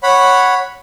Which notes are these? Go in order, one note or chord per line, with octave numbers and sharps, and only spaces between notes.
C#5 F#5 B5